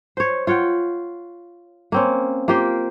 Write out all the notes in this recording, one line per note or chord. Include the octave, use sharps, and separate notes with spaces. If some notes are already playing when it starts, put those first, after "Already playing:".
C5 C#5
F4 C#5 F#5 G5
A#3 C4 C#4
A#3 F4 G4 C5